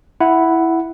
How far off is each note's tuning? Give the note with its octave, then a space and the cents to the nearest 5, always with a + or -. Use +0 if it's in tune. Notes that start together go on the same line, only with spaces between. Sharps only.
E4 +0 F#5 +0